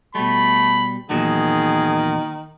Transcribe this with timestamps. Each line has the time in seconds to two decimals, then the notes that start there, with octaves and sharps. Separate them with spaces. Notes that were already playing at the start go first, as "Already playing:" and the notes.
0.15 B2 G3 A3 B5
1.10 E2 A#2 D#3 F#3 G#4